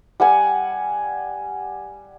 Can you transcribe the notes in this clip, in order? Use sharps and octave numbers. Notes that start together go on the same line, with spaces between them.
G3 F#5 G#5